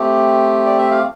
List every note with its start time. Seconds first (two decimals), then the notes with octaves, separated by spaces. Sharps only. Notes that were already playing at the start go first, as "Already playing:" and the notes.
Already playing: A3 C4 G4
0.66 D5
0.78 E5
0.91 F5